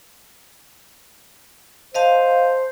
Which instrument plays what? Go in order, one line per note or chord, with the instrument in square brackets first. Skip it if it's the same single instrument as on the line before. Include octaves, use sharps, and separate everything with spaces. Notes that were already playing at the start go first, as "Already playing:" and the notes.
[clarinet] C5 [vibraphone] D#5 F5 A5